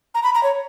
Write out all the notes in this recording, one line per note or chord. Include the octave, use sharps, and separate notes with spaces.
A#5
B5
A#5
C#5